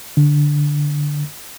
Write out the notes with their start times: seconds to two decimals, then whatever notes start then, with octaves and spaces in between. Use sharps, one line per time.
0.17 D3